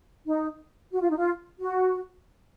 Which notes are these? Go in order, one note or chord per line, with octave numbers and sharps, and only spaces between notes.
D#4
F#4
F4
D#4
F4
F#4